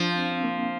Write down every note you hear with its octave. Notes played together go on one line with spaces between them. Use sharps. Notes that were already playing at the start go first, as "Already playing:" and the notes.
Already playing: F3 D4
C4
C4
A#3